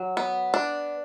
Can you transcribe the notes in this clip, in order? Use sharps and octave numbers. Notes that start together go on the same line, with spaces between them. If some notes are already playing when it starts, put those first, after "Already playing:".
Already playing: F#3
B3
D4